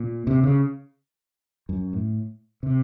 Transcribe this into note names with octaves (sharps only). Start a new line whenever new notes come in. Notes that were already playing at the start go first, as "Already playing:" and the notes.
Already playing: A#2
C3
C#3
F#2
A2
C3